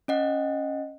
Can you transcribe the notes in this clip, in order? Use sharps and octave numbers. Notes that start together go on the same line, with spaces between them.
C#4 D#5 F#5